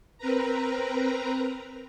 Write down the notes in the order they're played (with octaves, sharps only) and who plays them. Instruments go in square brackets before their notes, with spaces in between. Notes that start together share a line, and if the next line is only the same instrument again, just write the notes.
[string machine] C4 A#4 B4 A#5